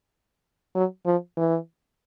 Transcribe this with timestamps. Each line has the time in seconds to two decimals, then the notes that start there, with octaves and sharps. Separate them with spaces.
0.75 F#3
1.06 F3
1.37 E3